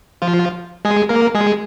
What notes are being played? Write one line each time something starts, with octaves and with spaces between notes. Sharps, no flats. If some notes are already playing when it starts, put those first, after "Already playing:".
F3 F4
G#3 G#4
A#3 A#4
G#3 G#4